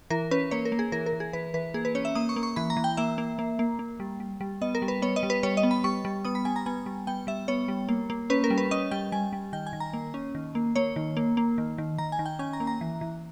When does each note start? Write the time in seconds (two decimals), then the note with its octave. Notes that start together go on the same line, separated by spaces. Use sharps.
0.10 E3 A#4
0.31 C#4 B4
0.51 A#3 C#5
0.65 A#4
0.72 A#3
0.79 G#4
0.92 E3 A#4
1.06 A#4
1.13 E3
1.20 G#4
1.33 E3 B4
1.54 E3 B4
1.74 A#3 G#4
1.85 B4
1.95 C#4 C#5
2.05 E5
2.15 A#3 D#6
2.29 C#6
2.36 A#3
2.43 C#6
2.56 E3 B5
2.70 A#5
2.77 E3
2.84 G5
2.97 A#3 E5
3.18 A#3
3.39 A#3
3.59 A#3
3.79 A#3
4.00 G3
4.20 G3
4.41 G3
4.61 B3 D#5
4.75 A#4
4.82 G3
4.88 B4
5.02 B3 C#5
5.16 D#5
5.23 G3
5.30 B4
5.43 G3 C#5
5.57 D#5
5.63 B3
5.71 B5
5.84 G3 C#6
6.05 G3
6.25 B3 D#6
6.35 B5
6.45 G3 G#5
6.56 A#5
6.66 B3 G#5
6.86 G3
7.07 B3 G5
7.27 G3 E5
7.48 B3 C#5
7.68 G3
7.89 A#3
8.10 A#3
8.30 C#4 B4
8.44 A#4
8.50 G3
8.58 B4
8.71 C#4 D#5
8.91 G3 G5
9.12 G3 G#5
9.33 G3
9.53 D#3 G5
9.67 G#5
9.73 D#3
9.80 A#5
9.93 A#3
10.14 C#4
10.35 D#3
10.55 A#3
10.76 A#3 C#5
10.96 D#3
11.17 A#3
11.37 A#3
11.58 D#3
11.78 D#3
11.98 D#3 A#5
12.12 G#5
12.19 D#3
12.26 G5
12.39 C#4 G#5
12.53 A#5
12.60 A#3
12.67 A#5
12.81 E3
13.01 E3